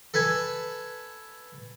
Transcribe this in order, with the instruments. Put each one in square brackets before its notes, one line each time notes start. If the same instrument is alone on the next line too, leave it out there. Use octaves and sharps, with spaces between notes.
[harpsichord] A4 B4 G#5 A5